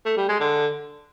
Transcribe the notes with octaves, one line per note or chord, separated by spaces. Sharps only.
A3
G3
G#3
D3